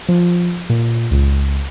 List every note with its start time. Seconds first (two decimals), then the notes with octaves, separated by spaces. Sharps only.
0.09 F3
0.69 A#2
1.11 C#2